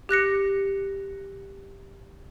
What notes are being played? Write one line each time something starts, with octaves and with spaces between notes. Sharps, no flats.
G4 F#6 A#6 C#7